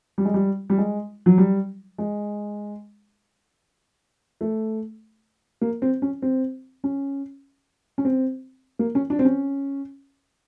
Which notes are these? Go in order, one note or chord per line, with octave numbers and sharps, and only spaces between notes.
G3
G#3
G3
G3
G#3
F#3
G3
G#3
A3
A#3
C4
C#4
C4
C#4
C#4
C4
A#3
C#4
D4
C4
C#4